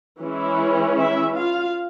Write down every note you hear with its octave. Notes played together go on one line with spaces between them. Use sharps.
E3 G#3 C#4 E4
E4 E5
F4 F5